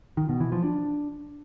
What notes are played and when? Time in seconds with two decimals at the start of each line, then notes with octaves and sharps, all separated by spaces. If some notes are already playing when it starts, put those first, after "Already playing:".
0.17 D#3
0.29 B2
0.40 E3
0.52 F3
0.64 D4